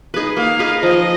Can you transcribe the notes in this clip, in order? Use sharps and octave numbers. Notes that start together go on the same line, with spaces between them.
D#4 G#4 B4
A#3 F5
D#4 G#4 B4
F3 D#5